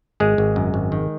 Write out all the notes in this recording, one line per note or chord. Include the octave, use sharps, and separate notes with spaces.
G#1 G#3 G#4
G#1
F#2
G#1
D#3